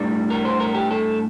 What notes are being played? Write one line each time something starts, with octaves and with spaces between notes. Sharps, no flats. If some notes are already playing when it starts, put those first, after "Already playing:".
Already playing: A2 G3 D4
A#4
C5
A#4
G4
A4